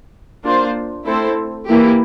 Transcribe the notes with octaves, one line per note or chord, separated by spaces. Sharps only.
A#3 D4 F4 C5
A3 C4 E4 A4 C5
E3 A#3 E4 G4